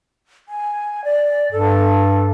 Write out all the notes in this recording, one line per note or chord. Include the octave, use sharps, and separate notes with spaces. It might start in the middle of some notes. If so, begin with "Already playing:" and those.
G#5
D5
G2 A4